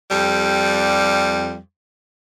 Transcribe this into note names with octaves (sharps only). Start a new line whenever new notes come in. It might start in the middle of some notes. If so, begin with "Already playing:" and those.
F2 G3